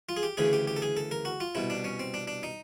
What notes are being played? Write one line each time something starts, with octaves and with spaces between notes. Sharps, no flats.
F4
G#4
G4
D2 C#3 E3 G#4
G4
G4
A4
G#4
A4
A#4
F#4
F4
C2 B2 E4
D4
C#4
C4
D4
D4
D#4